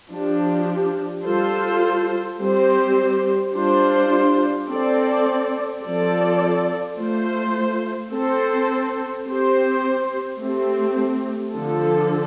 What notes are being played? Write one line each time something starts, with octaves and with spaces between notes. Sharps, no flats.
F3 D4 G4
G3 F4 A4 C5
G3 C4 G4 C5
G3 D4 F4 C5
C4 A4 D5
F3 C4 A4 D5
A3 F4 C5
C4 A4 C5
C4 G4 C5
A3 C4 G4
D3 F3 D4 A4